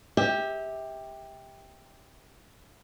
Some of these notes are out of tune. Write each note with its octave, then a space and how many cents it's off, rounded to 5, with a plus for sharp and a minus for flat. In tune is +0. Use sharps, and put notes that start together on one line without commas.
G4 +10 E5 -30